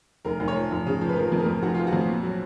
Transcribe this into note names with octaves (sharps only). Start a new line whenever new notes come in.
F1 A#4
F1
C#5
F3
F1
C#3
F3
B4
F3 A#4
F2
A#4
F2
F1 F#4
F3 F4
F#4
F2
A#2
F#3